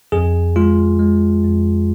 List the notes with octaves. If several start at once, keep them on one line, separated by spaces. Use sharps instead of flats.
F2 G#4
G#3 F4
G#3
F2